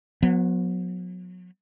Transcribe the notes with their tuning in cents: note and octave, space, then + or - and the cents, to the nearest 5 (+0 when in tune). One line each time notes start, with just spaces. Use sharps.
F#3 -35 B3 +0